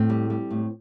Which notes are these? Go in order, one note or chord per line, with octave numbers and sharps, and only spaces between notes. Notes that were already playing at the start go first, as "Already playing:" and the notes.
Already playing: A2 C4
G3
G3
A2